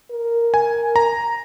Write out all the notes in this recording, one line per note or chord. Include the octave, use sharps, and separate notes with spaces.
A#4
G#5
A#5